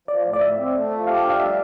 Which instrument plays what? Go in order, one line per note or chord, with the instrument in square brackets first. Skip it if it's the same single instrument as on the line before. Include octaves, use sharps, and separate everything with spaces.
[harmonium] F3 [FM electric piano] D5
[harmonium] A2
[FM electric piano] D5
[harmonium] A2 [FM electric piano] E5
[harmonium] C4
A3
F3
[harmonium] G4 [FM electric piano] F5
[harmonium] D4
[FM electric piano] F5
[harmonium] G3 [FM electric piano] E5